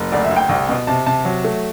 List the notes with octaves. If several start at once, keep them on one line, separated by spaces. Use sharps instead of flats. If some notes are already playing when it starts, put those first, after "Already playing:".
Already playing: F#1
D2 D5
E5
D2
G5
C2
B2
C3 A5
C3 A5
F#3
A3